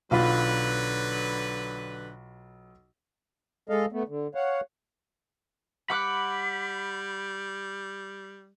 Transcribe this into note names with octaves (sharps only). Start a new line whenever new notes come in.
B1 D3 F#3 F4 B4 B5
G#3 A4 D#5 F5
A3 B3
D3
C#5 F5 F#5
G3 F#5 B5 D6 F#6